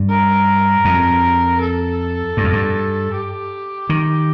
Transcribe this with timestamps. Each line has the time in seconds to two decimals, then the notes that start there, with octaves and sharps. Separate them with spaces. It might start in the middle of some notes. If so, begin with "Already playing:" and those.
Already playing: G2
0.10 A#4
0.85 F2
1.61 A4
2.37 G2
2.44 F2
2.52 G2
3.13 G4
3.89 D#3